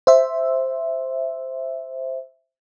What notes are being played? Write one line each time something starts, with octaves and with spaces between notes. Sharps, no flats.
C5 E5